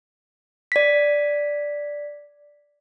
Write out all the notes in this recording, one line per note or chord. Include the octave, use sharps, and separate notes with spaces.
D5 B6